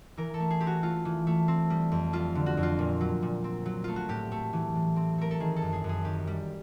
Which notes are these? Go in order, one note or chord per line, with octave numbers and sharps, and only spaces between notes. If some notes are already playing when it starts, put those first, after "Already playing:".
E3 A#4
A4
A3
G#4
C4 G4
F#4
A3 F4
E3
A3
C4
G3
F2
G3 F4
D3
F#4
F2
F4
A#2
F#3
A#2
C4
F#3
A3 F4
F#4
A2 G4
A3
E3
A2
C4
A3 A#4
A4
D#3 G#4
A4
F#2
G#4
F#2
G#4
D#3 G4
G3